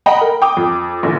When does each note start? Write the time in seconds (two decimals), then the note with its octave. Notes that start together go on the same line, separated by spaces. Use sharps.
0.06 D#5 F#5 G5 A#5 B5
0.21 A#4
0.42 G5 D6 D#6
0.57 F2
1.03 A#1 D3 E3